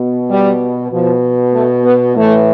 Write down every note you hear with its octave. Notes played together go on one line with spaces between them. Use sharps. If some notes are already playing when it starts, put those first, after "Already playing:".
Already playing: B2
G3
B2 F3
A3
B3
A2 E3 A3